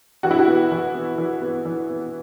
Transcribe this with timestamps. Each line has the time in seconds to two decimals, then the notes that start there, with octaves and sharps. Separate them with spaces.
0.23 E3 F#4
0.31 E4
0.39 F#4
0.47 B3
0.72 E3
0.94 B3
1.18 E3
1.41 B3
1.65 E3
1.89 B3